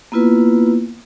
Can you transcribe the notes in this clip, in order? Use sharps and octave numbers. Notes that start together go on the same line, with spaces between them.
A#3 B3 E4 F4 B4